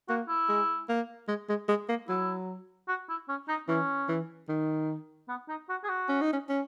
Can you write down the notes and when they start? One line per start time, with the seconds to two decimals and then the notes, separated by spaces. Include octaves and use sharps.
0.09 A#3 F#4
0.28 E4
0.49 G#3
0.89 A#3
1.28 G#3
1.49 G#3
1.68 G#3
1.89 A#3
2.08 F#3 E4
2.88 F#4
3.09 E4
3.29 C#4
3.48 D#4
3.68 E3 C#4
4.08 E3
4.49 D#3
5.28 B3
5.49 D#4
5.69 F#4
5.84 G#4
5.89 F#4
6.09 C#4
6.21 D#4
6.33 C#4
6.49 C#4